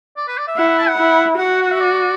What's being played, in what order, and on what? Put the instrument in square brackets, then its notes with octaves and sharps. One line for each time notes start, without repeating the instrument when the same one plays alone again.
[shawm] D5
B4
D5
E5
[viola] E4 [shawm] F#5
[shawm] F#5
A5
F#5
[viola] E4
[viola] F#4 [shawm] F#5
[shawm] F#5
E5
D5